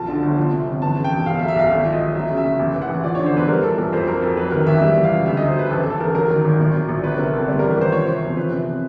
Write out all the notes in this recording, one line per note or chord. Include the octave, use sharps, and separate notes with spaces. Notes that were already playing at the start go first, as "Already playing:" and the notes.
Already playing: B1 F3 A5
D3
G1
F3
C3
G1
E3 A5
C#3
G5
E1
B1 F5
E5
F#3
E5
B1 F5
G#1 E5
F3
D#5
G#1
F#3 E5
C#3
E5
F#1
A1
E3
F#5
A1
F3 D5
D3 C#5
C5
E1 B4
G3 A#4
E3 A4
A#1 A#4
F2 C5
F#3 A#4
F2 A4
F#3 B4
D#3 A#4
A1 E5
G3 E5
E3
F5
C#2
D2 E5
F#3 D#5
C5
D2 B4
A1 A4
E3
A4
A1 A#4
F#3 A#4
D#3
G#1
A#1
F#3
A#1
G1 B4
C3 A#4
G1 A4
G3 D5
E3 A#4
B4
G#1 C5
F3 C#5
C3
C5
E1
F3 B4
C3